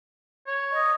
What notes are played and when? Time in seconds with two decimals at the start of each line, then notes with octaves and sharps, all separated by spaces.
0.47 C#5
0.72 D#5